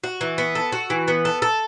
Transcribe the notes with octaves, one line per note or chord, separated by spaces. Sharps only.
F#4
E3
B3
A4
F#4
E3
B3
A4
A4